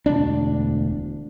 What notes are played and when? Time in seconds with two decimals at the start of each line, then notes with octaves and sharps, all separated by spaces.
0.06 E1 D2 D4